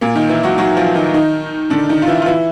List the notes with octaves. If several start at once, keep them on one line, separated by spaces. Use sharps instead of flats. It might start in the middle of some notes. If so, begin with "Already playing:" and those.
A#2 A#3
D#3 D#4
E3 E4
F#3 F#4
F#3 F#4
F3 F4
D#3 D#4
D#3 D#4
D3 D4
D#3 D#4
F4
E3 E4
F4
E3 E4